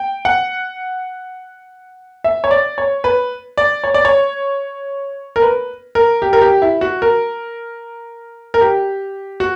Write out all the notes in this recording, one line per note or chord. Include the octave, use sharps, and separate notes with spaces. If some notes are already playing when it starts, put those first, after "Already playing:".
Already playing: G5
F#5
E5
C#5
D5
C#5
B4
D5
C#5
D5
C#5
A#4
B4
A#4
G4
A#4
G4
E4
F#4
A#4
A#4
G4
F#4